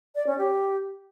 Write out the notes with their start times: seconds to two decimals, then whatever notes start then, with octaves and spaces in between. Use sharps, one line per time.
0.15 D5
0.27 C#4
0.38 G4